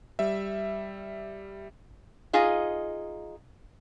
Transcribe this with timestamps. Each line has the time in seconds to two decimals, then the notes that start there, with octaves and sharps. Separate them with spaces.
0.19 G3 E5
2.33 D#4 F4 G#4 D#5